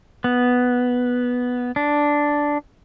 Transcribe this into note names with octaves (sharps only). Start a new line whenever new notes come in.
B3
D4